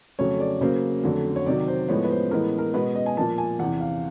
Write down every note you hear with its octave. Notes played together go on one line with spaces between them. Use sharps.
F2 C#3 F#3 A3 C#5
D5
C#3 F#3 A#3 C5
F2 D3 F#3 A3
C#5
C3 D#3 F#3 D5
C5
A2 F3 G#3 B3 C#5
B4
C5
A2 E3 G#3 B3 A#4
A#4
B2 G#3 B3 B4
D#5
G#5
A#2 F3 A#3 A5
G#5
E2 C3 E3 F#5
F5